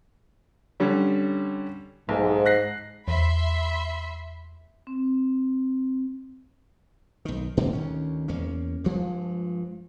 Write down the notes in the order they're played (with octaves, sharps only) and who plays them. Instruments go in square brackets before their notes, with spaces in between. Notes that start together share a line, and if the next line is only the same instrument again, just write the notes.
[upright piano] D3 G3 C#4
[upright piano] B1 [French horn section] G#2
[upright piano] F#6 A#6 C7
[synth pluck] E2 [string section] E5 B5 C6
[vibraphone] C4
[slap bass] B1 D#3
A#2 D3 F3 A#3
D2 D#3 C#4
E2 A#3 C#4
G2 F3 G#3